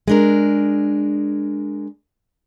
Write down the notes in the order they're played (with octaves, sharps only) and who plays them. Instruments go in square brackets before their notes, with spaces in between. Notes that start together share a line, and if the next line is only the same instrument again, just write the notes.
[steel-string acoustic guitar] G#3 D4 A#4